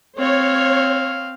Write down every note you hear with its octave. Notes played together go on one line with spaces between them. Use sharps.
C4 C#5 F5